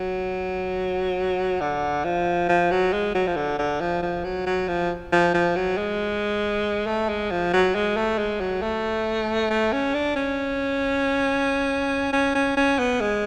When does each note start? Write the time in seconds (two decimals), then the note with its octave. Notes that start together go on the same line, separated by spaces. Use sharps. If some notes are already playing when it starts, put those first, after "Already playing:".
Already playing: F#3
1.61 D3
2.04 F3
2.49 F3
2.71 F#3
2.93 G#3
3.15 F#3
3.27 F3
3.36 D3
3.59 D3
3.80 F3
4.02 F3
4.24 F#3
4.46 F#3
4.68 F3
5.12 F3
5.34 F3
5.55 F#3
5.77 G#3
6.86 A3
7.09 G#3
7.31 F3
7.53 F#3
7.75 G#3
7.96 A3
8.18 G#3
8.40 F#3
8.62 A3
9.50 A3
9.72 C#4
9.94 D4
10.16 C#4
12.13 C#4
12.35 C#4
12.57 C#4
12.79 B3
13.00 G#3